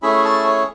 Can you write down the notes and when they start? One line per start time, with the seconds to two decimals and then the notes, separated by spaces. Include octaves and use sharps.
0.02 A3 C#4 E4 G#4 B5
0.24 A5
0.46 C#5